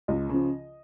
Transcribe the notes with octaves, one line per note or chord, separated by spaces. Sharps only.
C#2 D#5
C#3 F3